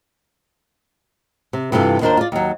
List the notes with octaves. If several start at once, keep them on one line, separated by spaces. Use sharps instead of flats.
C3
G2 C3 E3 F4 A4
D#2 A#3 D4 F4 A#4 C5
F4 D5
D#2 F#3